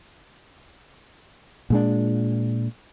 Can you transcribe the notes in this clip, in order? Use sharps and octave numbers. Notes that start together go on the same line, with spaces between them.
A#2 G#3 D4